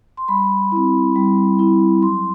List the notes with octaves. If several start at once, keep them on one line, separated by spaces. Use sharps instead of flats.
C6
G3 B5
C4 E4
G3
C4 E4
F#3 C6